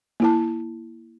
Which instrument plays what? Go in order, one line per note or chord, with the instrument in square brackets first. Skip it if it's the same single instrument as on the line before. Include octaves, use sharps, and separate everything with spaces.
[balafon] A#3 E4 A5